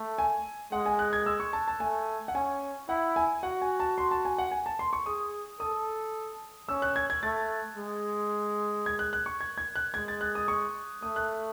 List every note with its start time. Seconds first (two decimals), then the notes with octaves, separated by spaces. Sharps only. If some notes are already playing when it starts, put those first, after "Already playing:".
Already playing: A3
0.18 G#5
0.72 G#3 F#5
0.86 G#5
0.99 F#6
1.13 G#6
1.26 E6
1.40 C#6
1.53 A5
1.68 A5
1.80 A3 G#5
2.28 F#5
2.35 C#4 G#5
2.89 E4 F#5
3.16 G#5
3.43 F#4 F#5
3.62 G#5
3.80 A5
3.98 C6
4.11 A5
4.25 G#5
4.38 F#5
4.51 G#5
4.66 A5
4.79 C6
4.93 C#6
5.06 G#4 D#6
5.60 A4 D#6
6.69 C#4 E6
6.82 F#6
6.96 G#6
7.10 G#6
7.23 A3 A6
7.77 G#3
8.86 G#6
8.99 F#6
9.13 F#6
9.26 C#6
9.41 G#6
9.58 G#6
9.76 F#6
9.94 G#3 G#6
10.08 A6
10.21 F#6
10.35 D#6
10.48 C#6
11.03 A3 D#6
11.16 F#6